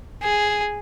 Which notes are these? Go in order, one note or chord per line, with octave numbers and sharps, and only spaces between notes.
G#4